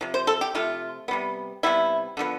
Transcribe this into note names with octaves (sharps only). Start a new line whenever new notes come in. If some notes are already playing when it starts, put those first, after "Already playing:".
C3 F3
C5
A4
G4
C3 F3 A3 F4
C3 G3 B3
C3 G3 B3 E4
D3 F3 B3